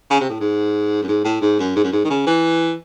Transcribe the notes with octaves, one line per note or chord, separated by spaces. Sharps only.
C#3
C3
A2
G#2
F#2
G#2
A2
G#2
F#2
G#2
F#2
G#2
D#3
C#3
E3